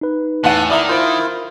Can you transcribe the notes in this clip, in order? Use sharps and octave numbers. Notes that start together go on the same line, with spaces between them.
D#4 B4
E2 A2 F#5 A5 F#6 D#7
D#3 E4 D5 E5 A#5 D#6
E4 F4 A#4 C5 D7